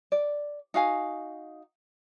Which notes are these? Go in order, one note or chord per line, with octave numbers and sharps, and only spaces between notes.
D5
D#4 F#4 F5 G#5